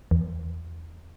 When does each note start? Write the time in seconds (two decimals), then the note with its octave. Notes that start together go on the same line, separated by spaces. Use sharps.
0.11 E2